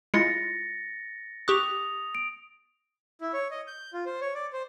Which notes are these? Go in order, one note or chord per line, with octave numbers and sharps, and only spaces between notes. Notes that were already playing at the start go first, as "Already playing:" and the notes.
G#3 E4 F4 A6 A#6 C#7
G4 C#6 D#6 F#6 F7
D7
E4
C#5
D#5
G6
F4
C5
C#5
D5
C5